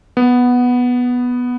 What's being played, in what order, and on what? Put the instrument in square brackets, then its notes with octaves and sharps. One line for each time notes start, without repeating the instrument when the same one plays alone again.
[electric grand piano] B3